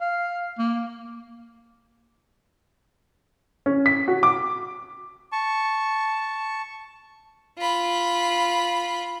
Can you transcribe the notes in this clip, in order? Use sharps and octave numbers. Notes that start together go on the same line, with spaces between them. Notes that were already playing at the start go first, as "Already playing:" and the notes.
F5
A#3
C#4
B6
F#4
D6
A5 C#6
F4 B5